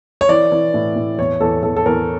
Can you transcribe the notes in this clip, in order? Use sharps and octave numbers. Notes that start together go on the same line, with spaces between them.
C#5
E3 D5
E3
A2
A2
E2 C#5
E2 A4
E2 A4
A4
E2 A#4